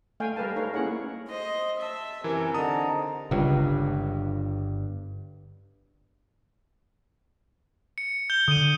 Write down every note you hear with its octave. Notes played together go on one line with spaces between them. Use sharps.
A3 F5 G5 G#5
G3 A#4 B4 F5 A5
A3 D#4 A#4 B4 C#5 F5
A#3 C#4 E4 G#4 C#5 F#5
C5 D#5
E5 A5
F#2 C3 E3 A#4 G#5
D3 D#4 A5 A#5 D#6
G1 C#2 G2
C#7
G6 G7
D3 D#6 D#7